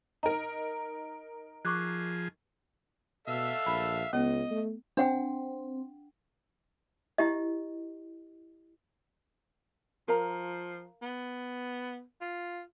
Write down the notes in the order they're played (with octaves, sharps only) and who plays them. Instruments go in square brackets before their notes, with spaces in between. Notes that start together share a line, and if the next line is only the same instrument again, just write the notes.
[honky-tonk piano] D#4 A#4 [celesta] A#5
[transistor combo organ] F3 G#4 [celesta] C#6 D6 F#6
[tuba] B2 [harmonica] A4 E5 F5
[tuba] A#1 [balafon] B5
[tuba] C#2 [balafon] B3 [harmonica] D#5
[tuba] A3
[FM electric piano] C4 [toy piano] D4 F#5 G5
[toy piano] E4 G4 D#5
[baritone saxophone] F3 [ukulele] A#4 F5 A#5
[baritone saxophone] B3
F4